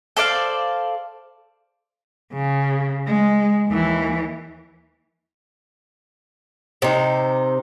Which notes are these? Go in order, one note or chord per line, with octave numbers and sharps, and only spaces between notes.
A4 C5 D5 F5
C#3
G#3
D#2 E3
C3 D#4